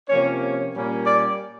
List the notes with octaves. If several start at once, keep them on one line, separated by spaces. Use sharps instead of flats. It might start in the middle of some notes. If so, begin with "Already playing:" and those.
C3 F3 A#3 C#4 C#5
C#5
A#2 G3 A#3 C#4
D5